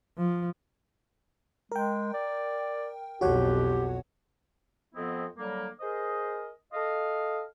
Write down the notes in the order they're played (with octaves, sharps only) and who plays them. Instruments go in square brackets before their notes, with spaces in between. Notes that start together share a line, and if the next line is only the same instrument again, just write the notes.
[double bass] F3
[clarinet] G#3 [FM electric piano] A#4 G5
[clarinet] D5
[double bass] B1 F2 [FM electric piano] F#4 C#5 F#5 [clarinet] G4
[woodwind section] F2 F3 B3 C4 E4 D#5
D3 F#3 G3 A#3
G#4 A#4 C5 D#5
A4 D#5 F5